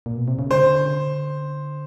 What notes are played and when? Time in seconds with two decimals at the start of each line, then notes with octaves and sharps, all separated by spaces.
0.06 A#2
0.17 B2
0.28 C3
0.39 C#3
0.50 D3 C5